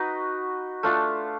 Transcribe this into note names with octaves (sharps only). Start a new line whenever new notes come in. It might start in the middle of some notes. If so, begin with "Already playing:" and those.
Already playing: D#4 F#4 B4 D#5
A3 D4 F4